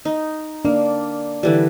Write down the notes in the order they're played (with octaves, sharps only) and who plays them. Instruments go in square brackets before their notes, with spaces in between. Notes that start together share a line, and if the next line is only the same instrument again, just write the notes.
[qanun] D#4
[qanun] A#3 [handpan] D4
[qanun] D3 E3 G3